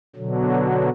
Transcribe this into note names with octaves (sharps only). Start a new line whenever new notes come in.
B2 D3 F#3